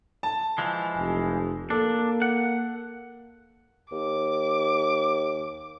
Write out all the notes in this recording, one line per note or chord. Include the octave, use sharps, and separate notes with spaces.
A5
E3 F3 G#3
F1
A#3 D4 A4
F#5
D#2 D6